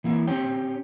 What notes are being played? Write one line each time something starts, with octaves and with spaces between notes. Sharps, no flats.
E3 A#3 E4
C4 C#4 G4 C#5 G5